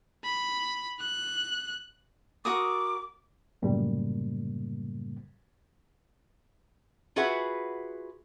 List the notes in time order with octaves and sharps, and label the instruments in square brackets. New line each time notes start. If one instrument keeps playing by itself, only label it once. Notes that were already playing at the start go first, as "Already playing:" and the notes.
[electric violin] B5
F#6
[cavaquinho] F#4 A#4 D#6 [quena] D6
[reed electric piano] C2 F#2 A2 C#3 G3 A#3
[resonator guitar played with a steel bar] F4 F#4 G#4 B4 E5 F#5